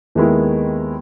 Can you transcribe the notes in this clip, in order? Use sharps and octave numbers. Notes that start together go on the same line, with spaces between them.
D#2 D#3 G#3 B3 E4